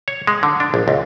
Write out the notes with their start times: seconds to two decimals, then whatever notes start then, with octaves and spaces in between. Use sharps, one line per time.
0.08 C#5
0.27 G#3
0.43 D3
0.60 D4
0.74 A#1
0.88 C#2